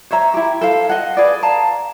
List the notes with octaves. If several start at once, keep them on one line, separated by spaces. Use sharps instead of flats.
C5 C#5 E5 A#5
E4 G4
A4 C5 F5
D#5 F#5
G#4 B4 D5
F5 A5 A#5